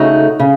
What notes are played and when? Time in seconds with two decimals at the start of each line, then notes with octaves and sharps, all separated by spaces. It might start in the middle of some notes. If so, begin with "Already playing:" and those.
Already playing: C#3 A3 D#4 F#4
0.39 C#3